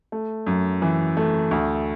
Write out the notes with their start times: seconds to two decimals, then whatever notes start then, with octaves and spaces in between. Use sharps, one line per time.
0.12 A3
0.47 F#2
0.82 E3
1.17 A3
1.51 D2